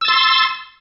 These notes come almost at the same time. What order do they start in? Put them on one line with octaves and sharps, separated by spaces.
E6 A6 C6